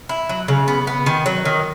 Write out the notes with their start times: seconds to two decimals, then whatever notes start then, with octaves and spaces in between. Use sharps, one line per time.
0.09 E4
0.29 F#3
0.48 C#3
0.68 B3
0.87 B3
1.06 D#3
1.26 F#3
1.45 D#3